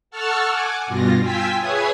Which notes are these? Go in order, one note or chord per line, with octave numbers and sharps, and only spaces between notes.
A4 F#5 A5 C#6 E6 F6
F#5 G#5 D6
G2 B2 F4 A#6
F4 G5 G#5 E6 B6
G#4 B4 C#5 E5 G#5 D#6